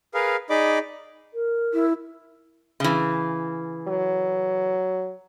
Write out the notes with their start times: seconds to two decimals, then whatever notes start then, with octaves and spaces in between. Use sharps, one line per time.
0.14 G#4 A#4 B4 F5
0.50 D#4 G#4 D5 D#5 B5 D6
1.34 A#4
1.73 E4
2.80 C#3 E3
3.88 F#3